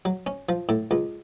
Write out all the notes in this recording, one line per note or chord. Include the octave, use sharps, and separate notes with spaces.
F#3
C#4
F3
A2
C#2